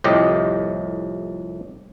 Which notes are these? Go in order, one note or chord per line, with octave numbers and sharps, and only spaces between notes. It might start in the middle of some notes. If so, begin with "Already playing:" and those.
C2 F2 A2 G4 D#5